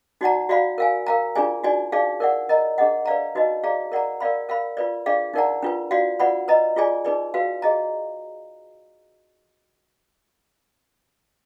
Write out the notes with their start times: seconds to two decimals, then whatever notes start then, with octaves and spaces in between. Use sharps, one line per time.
0.21 D#4 F#4 D5 F#5 A#5
0.49 F#4 D5 F5 B5
0.78 A#4 F5 G#5
1.06 A#4 F5 A#5
1.35 D4 F4 G#4 D5 G#5
1.63 D#4 F#4 D5 G#5
1.92 D#4 G#4 D5 F5
2.20 A#4 D5 F#5
2.49 A#4 D#5 A#5
2.78 D4 G#4 D#5 F#5
3.05 B4 D5 F5 A#5
3.35 D#4 F#4 B4 D#5
3.63 G#4 D5 F5 A#5
3.92 A#4 D5 F#5 A#5
4.20 A#4 D5 F5 B5
4.49 A#4 F5 B5
4.77 F4 B4 D5
5.06 D4 G#4 D5 F5
5.34 D#4 A#4 D5 F#5 A#5
5.62 D4 F4 B4
5.91 F#4 D5 F5
6.20 F4 B4 D5 F#5 B5
6.48 B4 D#5 A#5
6.76 F4 G#4 D5 G#5
7.05 D#4 G#4 B4 D5
7.34 F#4 B4 F5
7.62 G#4 D#5 A#5